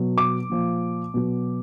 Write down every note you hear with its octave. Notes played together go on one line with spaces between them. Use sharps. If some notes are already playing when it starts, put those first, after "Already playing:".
Already playing: B2 F#3
D6
A#2 F3
B2 F#3